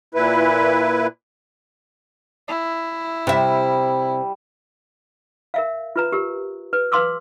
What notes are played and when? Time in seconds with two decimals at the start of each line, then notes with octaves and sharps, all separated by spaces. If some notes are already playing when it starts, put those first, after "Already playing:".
0.15 A#2 E4 B4
2.48 E4
3.27 C3 G3 E5
5.54 A#4 E5 F5
5.96 F4 B4 A#5
6.12 G4 A#4
6.73 B4
6.92 B4 F5 C6 D6 E6